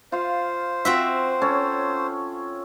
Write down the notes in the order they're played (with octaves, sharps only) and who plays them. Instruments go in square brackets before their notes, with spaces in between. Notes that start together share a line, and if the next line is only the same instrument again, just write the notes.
[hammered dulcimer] F4 F5 [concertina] C5
[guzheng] C4 F#4 E5 [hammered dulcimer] F4
[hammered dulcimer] C#4 A4 C#5